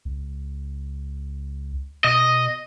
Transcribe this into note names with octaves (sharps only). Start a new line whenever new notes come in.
C#2
B2 D#5